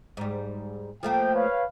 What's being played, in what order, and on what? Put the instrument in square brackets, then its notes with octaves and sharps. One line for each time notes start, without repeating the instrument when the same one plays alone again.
[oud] G#2 G3
[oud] F3 A3 A#3 [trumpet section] G5
[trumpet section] B4 C#5 F5